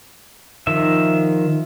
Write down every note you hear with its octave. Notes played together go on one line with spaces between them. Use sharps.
D#3 F3 E5